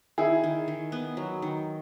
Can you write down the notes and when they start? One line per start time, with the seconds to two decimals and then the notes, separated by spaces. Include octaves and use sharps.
0.18 D#3 E4 G#4
0.44 D#3
0.68 D#3
0.92 B3
1.17 F#3
1.42 D#3